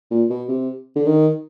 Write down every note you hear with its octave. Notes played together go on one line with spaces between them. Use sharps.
A#2
B2
C3
D3
D#3